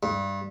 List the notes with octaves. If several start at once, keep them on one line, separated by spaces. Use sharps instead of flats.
G2